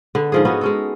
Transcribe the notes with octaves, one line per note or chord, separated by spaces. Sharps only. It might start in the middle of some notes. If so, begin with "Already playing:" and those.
D3 B3
G#2 F3 G#4
B3 C#4 D#4 F#4
G#3 C#4 A4